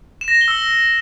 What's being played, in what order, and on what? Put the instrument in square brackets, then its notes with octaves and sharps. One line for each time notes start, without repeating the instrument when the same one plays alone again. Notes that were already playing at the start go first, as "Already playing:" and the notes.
[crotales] E7
A#6
E7
G7
E6